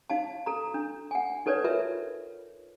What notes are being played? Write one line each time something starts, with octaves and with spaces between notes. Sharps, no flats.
D#4 F5 A5
A4 A#5
D4
F#5 G#5
D#4 A4 B4 C#5 D5
F4 A#4 B4 E5